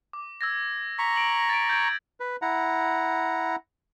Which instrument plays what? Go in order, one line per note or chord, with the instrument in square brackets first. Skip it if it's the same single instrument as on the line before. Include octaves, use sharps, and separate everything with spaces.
[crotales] D6
E6 G#6 A#6
[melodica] A#5 C#6 [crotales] B6
[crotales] D7 F#7
A6 D7
G6 G#6 D7
[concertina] B4
E4 F#5 A#5